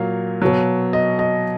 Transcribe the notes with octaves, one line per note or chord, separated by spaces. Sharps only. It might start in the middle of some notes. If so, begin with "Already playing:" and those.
Already playing: A#2 F#3 F5
B2 F#3
D#5
D#5